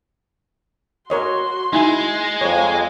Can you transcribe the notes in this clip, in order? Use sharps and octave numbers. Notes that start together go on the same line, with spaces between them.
F#4 A#4 C#5 D#5 C6
G#3 D#4 E4 G#5
F2 C#5 G#5